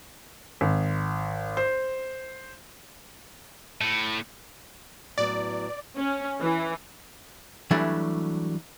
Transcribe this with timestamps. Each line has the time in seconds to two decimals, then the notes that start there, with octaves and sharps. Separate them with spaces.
0.61 G#1
1.57 C5
3.81 A2
5.18 A2 F#3 B3 D5
5.97 C#4
6.39 E3
7.71 E3 F#3 G3 A3 D4